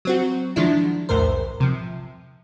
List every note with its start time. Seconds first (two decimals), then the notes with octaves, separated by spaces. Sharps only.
0.05 F#3 C4 F#4
0.56 D3 D#3 F3 G#3 D4 E4
1.09 B1 E2 A2 A#4 C5
1.60 C3 F3